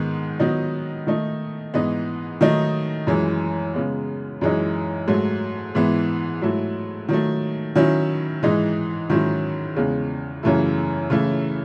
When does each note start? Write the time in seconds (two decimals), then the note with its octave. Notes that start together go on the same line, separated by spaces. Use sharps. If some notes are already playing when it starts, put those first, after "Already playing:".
Already playing: G#2 D#3 G#3 B3
0.40 D#3 F#3 B3 D#4
1.07 D#3 A3 D#4
1.74 G#2 E3 B3 D#4
2.41 D#3 F#3 A3 D#4
3.07 F#2 E3 G#3
3.74 C#3 G#3 B3
4.41 F#2 E3 G#3 D#4
5.07 G#2 F#3 A3
5.75 G#2 E3 B3 E4
6.42 G#2 F#3 A3 E4
7.09 D#3 F#3 A3
7.75 D#3 F#3 C#4 E4
8.43 G#2 E3 G#3 D#4
9.10 G#2 D#3 F#3 C#4 E4
9.76 E2 C#3 G#3
10.43 F#2 C#3 E3 A3 E4
11.10 C#3 E3 A3 E4